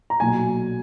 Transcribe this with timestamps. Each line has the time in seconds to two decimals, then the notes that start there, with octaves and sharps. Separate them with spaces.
0.10 A#5
0.20 B1 A#2 F#3 G#5